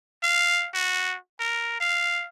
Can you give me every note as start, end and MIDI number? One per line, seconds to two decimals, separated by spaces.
0.23 0.68 77
0.74 1.16 66
1.39 1.75 70
1.80 2.26 77